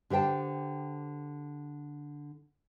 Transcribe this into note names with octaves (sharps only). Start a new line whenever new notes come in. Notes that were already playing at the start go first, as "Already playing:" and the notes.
D3 G4 C5 G5 A5